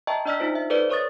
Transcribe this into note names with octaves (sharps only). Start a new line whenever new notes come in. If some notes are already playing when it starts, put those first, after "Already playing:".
D#5 E5 G5 A5 A#5 C#6
D4 D5 D#5 E6 F6 B6
D#4 F4 C5
E5
A4 B4 C5 D5
B4 C#5 C#6 D#6 A6